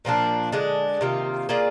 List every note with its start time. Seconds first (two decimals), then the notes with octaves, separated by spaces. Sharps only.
0.05 A#2 F3 A#3 D4
0.52 D3 G#3 D4
1.01 C3 D#3 A#3 F4
1.49 A#3 F4 G#4 D5